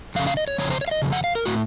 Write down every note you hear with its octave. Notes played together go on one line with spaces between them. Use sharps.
F2 C#3 F5
F5
D#5
C#5
F2 C#3 C#5
C5
C#5
F5
D#5
F2 C#3
F#5
F5
A#4
A2 F#4